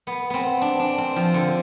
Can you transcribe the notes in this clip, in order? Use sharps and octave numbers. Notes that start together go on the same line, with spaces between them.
B3
B3 C4
D4
D4
C4
F3
D3